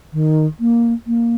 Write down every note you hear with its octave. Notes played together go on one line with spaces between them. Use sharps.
D#3
A#3
A#3